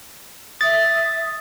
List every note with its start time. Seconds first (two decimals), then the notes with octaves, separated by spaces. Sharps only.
0.61 E5 D#6 A6